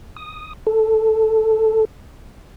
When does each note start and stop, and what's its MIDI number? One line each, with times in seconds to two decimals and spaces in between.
0.17 0.53 87
0.67 1.85 69